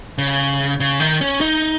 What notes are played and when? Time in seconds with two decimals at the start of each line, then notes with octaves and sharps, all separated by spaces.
0.18 C#3
0.80 C#3
1.00 D#3
1.21 C#4
1.41 D#4